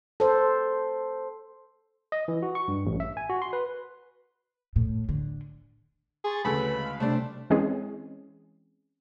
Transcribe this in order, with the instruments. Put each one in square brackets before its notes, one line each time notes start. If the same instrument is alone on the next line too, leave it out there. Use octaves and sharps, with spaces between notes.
[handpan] A4 C5
[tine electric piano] D#5
E3
F#4
C#6
G2
A1
E5
G#5
F#4
C6
B4
[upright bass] A2
D3
[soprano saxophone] G#4 [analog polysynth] C6 C#6 A6
[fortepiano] D2 C#3 A4 [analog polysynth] B4 [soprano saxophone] B5
[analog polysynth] G#3 F5
[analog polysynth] C3 G3 [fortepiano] A3 D4 [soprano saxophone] C5
[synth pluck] E3 G#3 C4 C#4 G#4